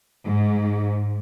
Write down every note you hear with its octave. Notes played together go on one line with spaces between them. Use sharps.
G#2